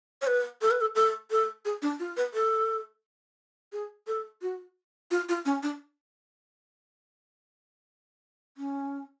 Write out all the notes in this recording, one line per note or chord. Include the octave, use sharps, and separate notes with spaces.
C#5
B4
A4
B4
A4
A4
A4
G#4
D4
F4
B4
A4
G#4
A4
F#4
F4
F4
C#4
D4
C#4